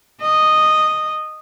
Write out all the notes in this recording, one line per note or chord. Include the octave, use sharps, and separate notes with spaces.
D#5